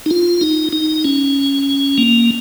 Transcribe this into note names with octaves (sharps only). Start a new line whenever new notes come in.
D#4
F4
D#4
D#4
C#4
A#3